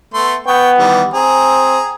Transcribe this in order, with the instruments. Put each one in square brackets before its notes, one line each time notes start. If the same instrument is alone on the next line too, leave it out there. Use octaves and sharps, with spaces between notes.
[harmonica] A3 B3 C6
[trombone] B3 [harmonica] G5 C#6
[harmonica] D#3 E3 G3
[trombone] C4 [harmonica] G#4 A#5